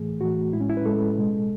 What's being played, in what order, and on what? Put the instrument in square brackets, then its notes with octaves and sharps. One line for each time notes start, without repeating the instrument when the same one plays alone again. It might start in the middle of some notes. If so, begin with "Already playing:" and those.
Already playing: [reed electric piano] A2 E3 A3 G#4
A2 E3 A3 F#4
A2 G#3 E4
C#4
E4
B4
A2 G#3 A4
B2 G#3